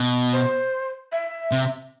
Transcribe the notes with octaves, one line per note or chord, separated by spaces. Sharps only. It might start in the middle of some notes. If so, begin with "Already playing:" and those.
Already playing: B2
C5
E5
C3